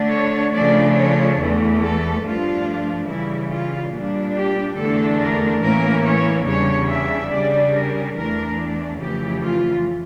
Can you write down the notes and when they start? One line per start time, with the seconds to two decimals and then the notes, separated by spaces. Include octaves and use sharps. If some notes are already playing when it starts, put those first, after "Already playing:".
Already playing: D3 A3 D4
0.12 C#5
0.55 C#3 F3 A3 D4 D5
0.97 C#5
1.40 E2 E3 A3
1.81 A4
2.23 G2 F3 A3 D4 F4
3.08 C#3 E3 G3 E4
3.51 F4
3.93 A#2 G3 D4
4.36 G4
4.77 E2 D3 A3 D4 A4
5.20 A#4
5.62 A2 E3 A#3 C#4 A#4
6.05 C#5
6.46 E2 C#3 G3 D4 C#5
6.89 E5
7.31 C#3 G3 D4 D5
7.74 A#4
8.16 E2 E3 A3 D4 A#4
9.01 F2 C#3 E3 A3 G4
9.44 F4